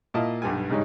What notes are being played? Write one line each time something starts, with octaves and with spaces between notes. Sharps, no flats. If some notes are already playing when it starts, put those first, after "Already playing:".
A#2 E4 F4 D#5 A5
B1 G2 G3 G#5
G#2 C#3 G3 C#4 D#4